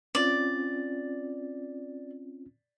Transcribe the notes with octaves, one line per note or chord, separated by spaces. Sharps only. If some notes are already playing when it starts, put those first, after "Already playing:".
C4 C#4 F4 D5